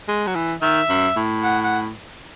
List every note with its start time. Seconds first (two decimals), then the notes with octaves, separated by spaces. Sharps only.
0.08 G#3
0.27 F#3
0.35 E3
0.62 D#3 E5
0.89 F#2
1.16 A2
1.43 F#5
1.64 F#5